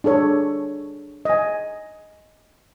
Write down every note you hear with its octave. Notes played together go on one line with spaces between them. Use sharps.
D4 G#4 A4 C#5
D#5 G#5